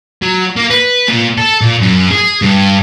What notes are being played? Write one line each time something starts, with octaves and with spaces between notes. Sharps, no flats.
F#3
A#3
B4
A#2
A4
A#2
F#2
G#4
G2